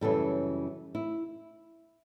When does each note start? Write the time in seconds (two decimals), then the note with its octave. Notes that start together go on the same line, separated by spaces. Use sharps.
0.01 F#2 C#3 E3 G3 A4
0.95 E4